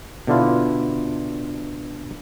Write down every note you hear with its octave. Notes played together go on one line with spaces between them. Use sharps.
B2 D3 D4 E4 F4